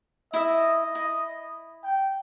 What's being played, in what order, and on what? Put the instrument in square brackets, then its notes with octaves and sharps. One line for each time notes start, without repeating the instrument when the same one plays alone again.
[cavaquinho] E4 E5 [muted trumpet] D#5
[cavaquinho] E4
[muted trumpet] G5